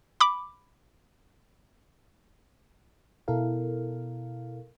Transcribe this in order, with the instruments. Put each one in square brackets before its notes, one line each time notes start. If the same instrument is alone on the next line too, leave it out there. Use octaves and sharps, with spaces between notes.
[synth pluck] B5 D6
[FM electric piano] B2 E4 A4 A#4 F5